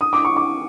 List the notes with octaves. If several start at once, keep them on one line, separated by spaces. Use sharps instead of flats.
D#6
D6
C#6
D6